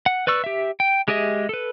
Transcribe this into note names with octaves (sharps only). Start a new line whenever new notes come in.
F#5
B4 D5 C#6 E6
G4 E5
G5
G#3 G4 G#4 D#5 E5
A4 B4